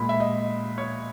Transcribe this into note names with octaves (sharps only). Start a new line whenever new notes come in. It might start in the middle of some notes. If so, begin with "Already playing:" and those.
Already playing: A#2 G#3 B5
E5
D#5
C#5